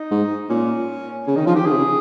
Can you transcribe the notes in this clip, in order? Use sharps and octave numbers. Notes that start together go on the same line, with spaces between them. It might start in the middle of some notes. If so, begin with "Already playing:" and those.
Already playing: D#4
G#2
A#2 C#4
C#3 C#4
D#3 D#4
F3 F4
D#3 G4
D#3 G#4
C3
C#3